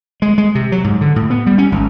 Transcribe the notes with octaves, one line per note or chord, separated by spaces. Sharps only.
G#3
G#3
C3
F#3
G#2
D3
A2
B3
G3
C#4
G#1